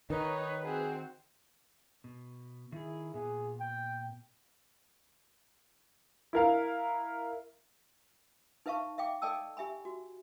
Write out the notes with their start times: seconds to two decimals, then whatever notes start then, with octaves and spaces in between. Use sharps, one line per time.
0.10 D#3 D#4 B4 C#5
0.63 C4 F#4 G#4
2.04 B2
2.72 D#3 E4 G#4
3.14 A#2 B3 G#4
3.60 G5
6.33 E4 A#4 F5
8.66 D#4 B4 E5 F5 A5 C#6
8.98 E5 F5 G5 D6
9.22 A4 D5 D#5 G5 A5 E6
9.57 G4 E5 G#5 B5
9.85 F#4